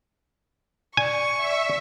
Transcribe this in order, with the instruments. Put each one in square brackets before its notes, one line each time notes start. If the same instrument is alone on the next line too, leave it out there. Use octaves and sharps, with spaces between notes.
[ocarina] D5 [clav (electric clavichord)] G#5 [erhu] C#6
[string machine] E5